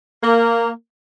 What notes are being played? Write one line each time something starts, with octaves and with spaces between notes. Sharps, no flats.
A#3